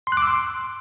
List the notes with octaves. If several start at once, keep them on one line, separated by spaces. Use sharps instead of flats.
C6
F#6
D6
E6
C6